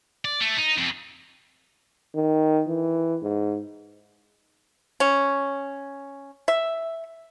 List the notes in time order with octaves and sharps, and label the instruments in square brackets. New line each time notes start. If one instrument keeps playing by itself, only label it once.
[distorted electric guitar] D5
A3
D#4
F2
[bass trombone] D#3
E3
G#2
[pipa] C#4
E5